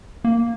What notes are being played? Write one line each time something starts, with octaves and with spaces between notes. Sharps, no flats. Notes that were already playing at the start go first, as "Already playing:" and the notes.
A#3